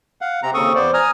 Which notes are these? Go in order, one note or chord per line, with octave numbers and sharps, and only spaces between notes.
F5 F#5
C3 C4 A#5
D#2 C#3 C4 A4 C#6 D#6
E2 B3 C5 D5
G#5 A#5 D#6 F6